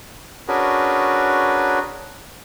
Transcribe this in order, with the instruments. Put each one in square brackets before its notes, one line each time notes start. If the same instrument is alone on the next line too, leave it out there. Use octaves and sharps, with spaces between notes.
[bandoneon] C#4 D4 F#4 G#4 A#4 B4